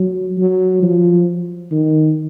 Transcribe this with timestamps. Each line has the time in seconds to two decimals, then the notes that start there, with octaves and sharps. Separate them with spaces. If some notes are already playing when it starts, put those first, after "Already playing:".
Already playing: F#3
0.38 F#3
0.82 F3
1.71 D#3